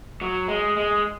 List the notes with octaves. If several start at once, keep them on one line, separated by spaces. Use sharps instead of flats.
F#3
G#3
G#3